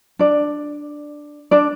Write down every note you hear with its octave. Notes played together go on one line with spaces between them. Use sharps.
D4 D5
D4 D5